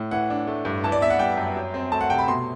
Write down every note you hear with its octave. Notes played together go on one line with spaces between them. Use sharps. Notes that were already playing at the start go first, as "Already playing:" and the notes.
Already playing: A2
E3 F#5
D4
A3
G2
E3 A5
D5
B3 E5
F#5
G3 G5
F#2
F#3
C4
A3 A5
F#5
C3 G5
B5
B2 C6